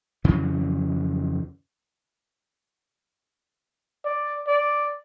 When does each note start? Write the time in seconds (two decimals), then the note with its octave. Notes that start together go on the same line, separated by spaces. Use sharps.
0.24 F2 C#3 E3 F#3
4.05 D5
4.48 D5